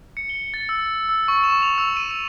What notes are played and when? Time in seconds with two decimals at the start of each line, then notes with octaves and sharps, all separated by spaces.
0.17 C#7
0.29 G7
0.54 A6
0.69 E6
0.86 E6
1.09 E6
1.28 C#6
1.44 E7
1.63 F7
1.78 E6
1.97 D#7
2.11 D#7